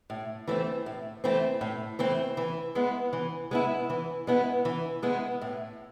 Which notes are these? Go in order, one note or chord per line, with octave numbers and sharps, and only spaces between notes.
A2
E3 A3 C4
A2
E3 A3 C4
A2
E3 A3 C4
E3
G#3 B3 E4
E3
G#3 B3 E4
E3
G#3 B3 E4
E3
G#3 B3 E4
A2